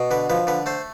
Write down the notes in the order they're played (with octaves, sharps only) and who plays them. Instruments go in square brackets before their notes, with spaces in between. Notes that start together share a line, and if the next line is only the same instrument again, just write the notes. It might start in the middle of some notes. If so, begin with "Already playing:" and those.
Already playing: [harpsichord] B2
D3 B4
F3 B4
D3 B4
A3 C5